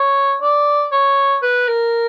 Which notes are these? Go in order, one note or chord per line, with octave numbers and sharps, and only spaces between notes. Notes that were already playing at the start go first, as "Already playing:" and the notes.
Already playing: C#5
D5
C#5
B4
A#4